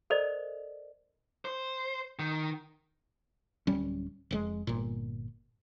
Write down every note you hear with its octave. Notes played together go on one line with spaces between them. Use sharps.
A4 A#4 C5 D5 D#5
C5
D#3
D1 G3 C#4
F1 B2 G#3
G1 A#2